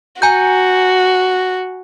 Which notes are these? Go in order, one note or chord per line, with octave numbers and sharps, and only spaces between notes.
F#4 G#5 A#5 G6